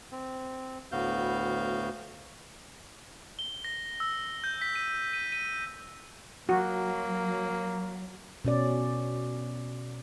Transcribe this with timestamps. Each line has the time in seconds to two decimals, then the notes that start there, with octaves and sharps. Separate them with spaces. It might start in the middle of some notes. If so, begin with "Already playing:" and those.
0.12 C4
0.92 D2 A2 B3 F#4 F5 G6
3.39 G7
3.65 A#6
4.00 E6
4.44 G6
4.61 B6
4.75 D#7
5.13 D#7
5.32 D#7
6.49 F#3 A#3 F#4
8.45 B2 C#4 D5